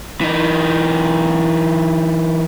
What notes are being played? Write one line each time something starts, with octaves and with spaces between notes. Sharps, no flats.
E3 D#4